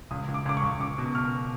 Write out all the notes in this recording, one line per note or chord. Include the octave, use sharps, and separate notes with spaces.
C#2 D#6
C#2
D6
C#2 D6
C#6
C#2
C#2 D6
B2
B2 F6